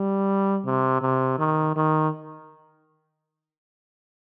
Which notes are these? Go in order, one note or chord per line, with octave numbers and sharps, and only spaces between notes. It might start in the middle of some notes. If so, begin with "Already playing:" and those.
Already playing: G3
C3
C3
D#3
D#3